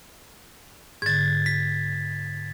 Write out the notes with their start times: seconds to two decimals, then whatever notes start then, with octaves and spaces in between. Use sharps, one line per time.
1.02 G#2 D3 G#6 A6
1.46 B6